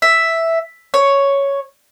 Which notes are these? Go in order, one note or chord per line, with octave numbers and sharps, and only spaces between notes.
E5
C#5